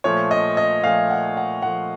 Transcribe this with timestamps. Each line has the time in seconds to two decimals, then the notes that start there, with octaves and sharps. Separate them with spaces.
0.04 A#2 F3 A3 C#5
0.31 D#5
0.57 D#5
0.84 A#2 F3 A3 F5
1.11 F#5
1.37 F#5
1.62 A#2 F3 A3 F#5